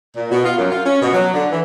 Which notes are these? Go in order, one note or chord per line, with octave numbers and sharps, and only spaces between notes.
A#2
B2
F4
F#2
F4
C#4
B2
F#3
D3
E3